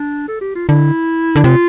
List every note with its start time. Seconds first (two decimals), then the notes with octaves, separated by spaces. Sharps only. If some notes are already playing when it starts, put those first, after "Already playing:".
Already playing: D4
0.28 A4
0.41 G4
0.55 F4
0.68 D3 E4
1.36 D3
1.44 C3 F4